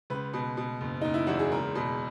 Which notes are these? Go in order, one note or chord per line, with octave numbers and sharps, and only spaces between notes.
C#2 B4
B2
B2
F#1
F#1 D#4
E4
E2 F#4
G#4
C#2 A#4
B2